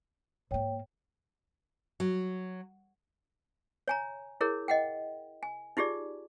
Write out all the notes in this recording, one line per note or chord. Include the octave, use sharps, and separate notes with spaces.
G#2 A#3 C#5 G5
F#3
C#5 G#5 A#5
E4 G#4 A#4 C#5
D#5 F#5 G5
G#5
D#4 F4 G4 G#4 D5